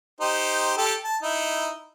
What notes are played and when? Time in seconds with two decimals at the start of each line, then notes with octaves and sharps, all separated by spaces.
0.21 D#4 G4 C5
0.77 G4 A4
1.04 A5
1.22 D#4 E4